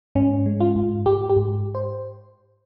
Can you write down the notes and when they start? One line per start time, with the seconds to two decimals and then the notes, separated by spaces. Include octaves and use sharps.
0.15 G#2 C#4
0.46 G#3
0.60 F4
0.76 G#2
1.06 G#2 G4
1.29 G4
1.36 G#2
1.75 C5